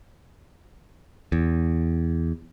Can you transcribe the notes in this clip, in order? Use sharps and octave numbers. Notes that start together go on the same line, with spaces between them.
E2